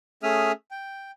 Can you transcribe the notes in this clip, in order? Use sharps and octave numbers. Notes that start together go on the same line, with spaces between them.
A3 C#4 G#4 E5 D#6 F6
G5